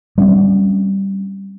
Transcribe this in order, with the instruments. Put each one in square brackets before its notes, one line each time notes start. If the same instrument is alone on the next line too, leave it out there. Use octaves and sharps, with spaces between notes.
[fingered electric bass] G3 C4 C#4